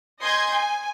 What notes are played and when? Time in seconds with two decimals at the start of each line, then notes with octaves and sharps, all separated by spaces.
0.21 D#5 G#5 C6 G6 G#6
0.53 G#5